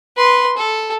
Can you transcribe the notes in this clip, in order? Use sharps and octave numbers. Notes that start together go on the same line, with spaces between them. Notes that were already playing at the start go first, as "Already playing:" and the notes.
B4 C6
A4